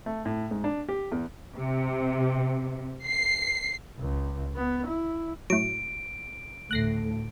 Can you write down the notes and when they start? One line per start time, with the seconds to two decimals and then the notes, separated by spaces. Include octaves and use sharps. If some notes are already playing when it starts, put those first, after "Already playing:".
0.06 A3
0.25 A2
0.51 G#2
0.64 D4
0.89 G4
1.12 E2
1.53 C3
3.06 C7
3.99 C#2
4.56 B3
4.86 E4
5.50 A2 F#3 D7
6.71 D2 A2 A3 F#6 A#6 C7